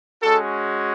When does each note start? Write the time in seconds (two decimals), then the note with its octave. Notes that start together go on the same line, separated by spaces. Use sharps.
0.22 G#3 C#4 F#4 A4